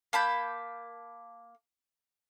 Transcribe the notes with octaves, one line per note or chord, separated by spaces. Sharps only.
A#3 A5 B5 G6